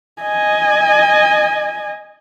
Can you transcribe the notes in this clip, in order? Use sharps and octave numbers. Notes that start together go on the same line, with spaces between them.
D#5 G#5